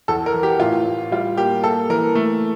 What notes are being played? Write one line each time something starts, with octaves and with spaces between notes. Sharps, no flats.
E2 A4
A#4
E3
G4
A2 F4
A2
G3 F4
A#3 G4
A#3 A4
E3 A#4
A3